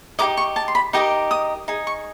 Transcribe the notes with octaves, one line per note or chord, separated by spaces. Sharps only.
D#4 G4 A#4 D#5 D6
C#6
A5
C6
B5
D#4 G4 A#4 D#5 D6
D#6
D#4 G#4
C#6